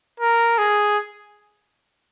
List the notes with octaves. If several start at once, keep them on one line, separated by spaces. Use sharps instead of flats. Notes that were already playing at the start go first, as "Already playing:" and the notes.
A#4
G#4